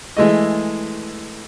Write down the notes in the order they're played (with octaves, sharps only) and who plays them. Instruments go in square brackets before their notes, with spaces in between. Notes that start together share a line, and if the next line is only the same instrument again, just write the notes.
[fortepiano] E3 G#3 A3 D#5